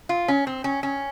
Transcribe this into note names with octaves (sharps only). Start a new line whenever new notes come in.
F4
C#4
C4
C#4
C#4